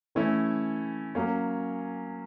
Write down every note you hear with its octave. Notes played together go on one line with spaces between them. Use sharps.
E3 A3 C#4 E4
F#3 A#3 C#4